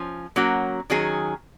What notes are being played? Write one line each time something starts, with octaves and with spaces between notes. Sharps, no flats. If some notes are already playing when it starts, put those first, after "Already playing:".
Already playing: F3 C#4
F#3 A#3 C#4 F#4
D#3 F#3 C#4 G#4